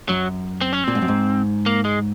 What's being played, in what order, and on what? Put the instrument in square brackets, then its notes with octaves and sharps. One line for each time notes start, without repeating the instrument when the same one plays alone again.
[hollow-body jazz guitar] F#2 [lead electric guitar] F#3
[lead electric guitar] C4
C#4
[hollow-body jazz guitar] A#2 [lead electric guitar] C4
[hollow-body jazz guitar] G#2
F#2
G#2
[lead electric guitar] A#3
G#3